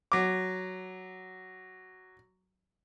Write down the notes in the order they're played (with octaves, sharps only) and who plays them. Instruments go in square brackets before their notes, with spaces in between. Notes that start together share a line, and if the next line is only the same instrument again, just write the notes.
[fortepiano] F#3 D6